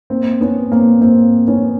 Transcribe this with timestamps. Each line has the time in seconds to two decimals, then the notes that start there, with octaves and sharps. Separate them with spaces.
0.10 A#3 C4
0.41 B3 C#4
0.71 A#3 C4
1.02 A#3 C4
1.48 B3 C#4